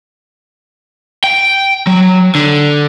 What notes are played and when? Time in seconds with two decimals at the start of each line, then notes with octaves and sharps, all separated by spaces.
1.24 G5
1.87 F#3
2.35 D3